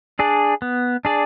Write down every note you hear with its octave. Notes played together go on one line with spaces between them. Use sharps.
D4 G#4 D5
B3
D4 G#4 D5